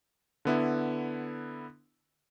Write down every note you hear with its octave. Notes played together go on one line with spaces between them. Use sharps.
D3 B3 E4